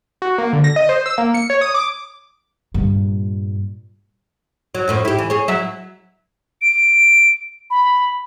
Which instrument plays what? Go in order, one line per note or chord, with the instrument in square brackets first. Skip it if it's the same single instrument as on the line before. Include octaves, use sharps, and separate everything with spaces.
[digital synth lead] F#4
A#3
D3
A#6
D#5
C5
E6
A#3
C#7
C#5
D#6
D6
[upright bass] G2 A#2
[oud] F#3
F#2 A2 F3
E4 G4
E3
G#4 C#5
F#3 E4 E5
[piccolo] D7
B5